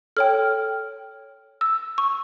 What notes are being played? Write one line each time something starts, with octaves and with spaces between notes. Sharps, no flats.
A4 C#5 G5 F6
E6
C#6